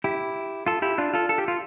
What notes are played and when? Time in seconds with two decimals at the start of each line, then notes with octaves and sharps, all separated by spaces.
0.04 E4 G4
0.66 F4 A4
0.82 E4 G4
0.98 D4 F4
1.13 F4 A4
1.29 A4
1.38 G4
1.48 F4